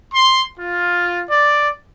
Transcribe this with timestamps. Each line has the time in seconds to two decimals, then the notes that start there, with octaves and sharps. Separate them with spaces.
0.13 C6
0.60 F4
1.30 D5